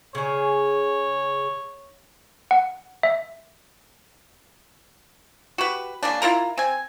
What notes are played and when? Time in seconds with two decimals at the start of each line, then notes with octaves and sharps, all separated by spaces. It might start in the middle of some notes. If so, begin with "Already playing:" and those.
0.15 C#3 G#4 C#5
2.51 F#5
3.03 E5
5.58 F#4 G4 B4
6.03 C#3 A#3 D4
6.22 E4 F4 A#4 A#5
6.58 C4 G#5